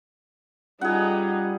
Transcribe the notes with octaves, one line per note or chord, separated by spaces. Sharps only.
G3 C#4 D#4 F4 G#4 F#5